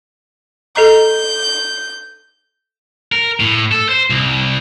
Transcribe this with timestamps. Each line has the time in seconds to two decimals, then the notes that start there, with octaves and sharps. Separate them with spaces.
0.76 A4 D#5 A#5 G6
3.12 A#4
3.40 A2
3.72 A4
3.89 C5
4.10 C2